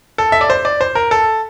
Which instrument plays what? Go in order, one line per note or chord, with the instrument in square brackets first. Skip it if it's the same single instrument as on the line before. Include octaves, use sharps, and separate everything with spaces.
[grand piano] A4
E5
D5
C5
D5
C5
A#4
A4